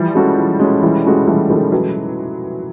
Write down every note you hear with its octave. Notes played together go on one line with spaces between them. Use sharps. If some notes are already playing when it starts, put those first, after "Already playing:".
Already playing: E3 F3 G3
G#3 C#4 F#4 A4
E3
G#3 C#4 F#4 A4
E3 F3 G3
G#3 C#4 F#4 A4
E3 G3 A3
D#3 F3 G#3 C#4 F#4 A4
E3 F#3